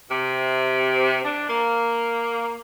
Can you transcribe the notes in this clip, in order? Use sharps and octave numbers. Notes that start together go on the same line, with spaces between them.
C3
D4
A#3